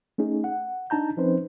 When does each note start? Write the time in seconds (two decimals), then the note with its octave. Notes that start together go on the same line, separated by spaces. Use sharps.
0.18 A3 C#4 D#4 G#4
0.44 F#5
0.90 D4 D#4 A5 A#5 G6
1.17 F3 C4 C#4 D#4 B4 C5